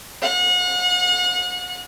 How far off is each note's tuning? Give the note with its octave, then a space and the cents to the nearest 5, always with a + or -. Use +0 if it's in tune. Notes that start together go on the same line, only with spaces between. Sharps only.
F#5 -40